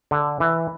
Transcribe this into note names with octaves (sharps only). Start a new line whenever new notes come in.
D3
E3